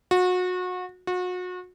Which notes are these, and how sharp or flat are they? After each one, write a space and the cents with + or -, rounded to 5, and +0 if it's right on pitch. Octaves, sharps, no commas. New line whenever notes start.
F#4 -30
F#4 -35